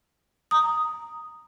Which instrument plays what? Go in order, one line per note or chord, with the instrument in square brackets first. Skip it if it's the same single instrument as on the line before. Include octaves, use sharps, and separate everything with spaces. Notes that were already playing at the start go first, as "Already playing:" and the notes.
[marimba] A#5 D#6